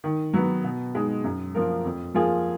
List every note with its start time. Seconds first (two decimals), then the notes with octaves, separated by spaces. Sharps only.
0.04 D#3
0.34 F#3 B3
0.64 B2
0.95 G#3 D#4
1.24 F#2
1.55 F3 A#3 F4 A#4
1.85 F2
2.14 F3 A#3 F4 G#4